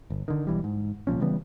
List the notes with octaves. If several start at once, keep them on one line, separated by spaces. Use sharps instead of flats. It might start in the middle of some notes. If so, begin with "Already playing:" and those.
G1
D3 D#3
B1 E3 G3
G#2
C2 A#2 F3 C#4
C#3 E3 G3 B3